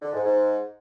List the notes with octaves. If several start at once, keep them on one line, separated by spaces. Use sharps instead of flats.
D3
G#2
G#2